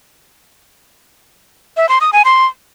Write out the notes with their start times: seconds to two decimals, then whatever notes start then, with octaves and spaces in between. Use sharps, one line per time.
1.77 E5
1.89 C6
2.01 D#6
2.13 G#5
2.25 C6